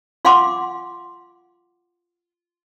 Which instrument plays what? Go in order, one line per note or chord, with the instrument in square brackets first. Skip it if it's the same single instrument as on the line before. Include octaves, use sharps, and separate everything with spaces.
[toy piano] F4 F5 F#5 G#5 C6 D6